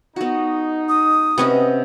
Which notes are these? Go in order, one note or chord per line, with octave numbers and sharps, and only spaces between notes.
B3 D#4 F#4
D#6
C3 B3 C#4 F#4 D#5